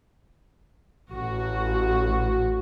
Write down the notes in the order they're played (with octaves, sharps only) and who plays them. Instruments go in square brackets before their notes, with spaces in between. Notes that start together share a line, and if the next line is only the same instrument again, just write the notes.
[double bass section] A1 [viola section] F#4